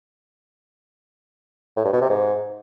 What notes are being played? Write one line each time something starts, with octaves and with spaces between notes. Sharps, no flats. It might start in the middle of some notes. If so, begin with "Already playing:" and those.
A2
G2
B2
C3
G#2